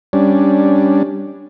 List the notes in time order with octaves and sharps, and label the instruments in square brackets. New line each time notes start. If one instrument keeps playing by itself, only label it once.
[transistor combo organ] G3 C#4 D4